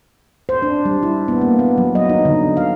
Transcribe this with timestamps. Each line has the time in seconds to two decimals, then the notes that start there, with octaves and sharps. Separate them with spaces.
0.49 C5
0.62 D4
0.85 G3
1.03 E4
1.28 B3
1.41 A#3
1.59 B3
1.78 F#3
1.95 D#5
2.09 D#4
2.25 D3
2.57 F5